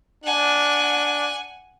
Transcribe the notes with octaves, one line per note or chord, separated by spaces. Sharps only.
D4 F#5 G#5